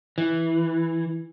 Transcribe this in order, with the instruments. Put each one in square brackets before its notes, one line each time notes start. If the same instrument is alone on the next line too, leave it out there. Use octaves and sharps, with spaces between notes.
[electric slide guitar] E3